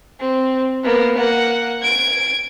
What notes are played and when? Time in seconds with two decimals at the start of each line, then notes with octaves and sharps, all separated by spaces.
0.20 C4
0.84 A#3 B3
1.17 A#3 F#5
1.82 G#6 D7